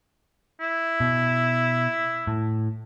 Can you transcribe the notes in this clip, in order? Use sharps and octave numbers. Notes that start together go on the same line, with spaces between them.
E4
B2
A2